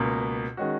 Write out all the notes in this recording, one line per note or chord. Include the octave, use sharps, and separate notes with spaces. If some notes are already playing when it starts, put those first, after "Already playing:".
Already playing: C#2 B2 A#3
D#3 G#3 C#4 F#4